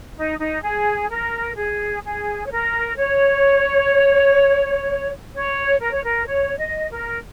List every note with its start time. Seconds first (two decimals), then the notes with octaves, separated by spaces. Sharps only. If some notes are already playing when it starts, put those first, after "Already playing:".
0.15 D#4
0.38 D#4
0.62 G#4
1.09 A#4
1.56 G#4
2.03 G#4
2.45 C#5
2.50 A#4
2.97 C#5
5.33 C#5
5.79 A#4
5.91 C#5
6.03 A#4
6.26 C#5
6.57 D#5
6.89 A#4